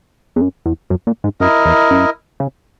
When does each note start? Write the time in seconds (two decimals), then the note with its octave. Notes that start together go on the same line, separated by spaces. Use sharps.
0.36 E2
0.41 F#2
0.66 E2
0.90 F#2
1.07 A#2
1.24 G#2
1.40 F#2 E4 A#4 D#5
1.65 E2
1.91 F#2
2.40 C#3